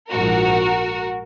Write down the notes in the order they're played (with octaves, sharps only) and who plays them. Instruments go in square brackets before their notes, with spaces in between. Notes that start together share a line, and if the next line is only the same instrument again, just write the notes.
[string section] A#1 G#2 F3 F#4 A#4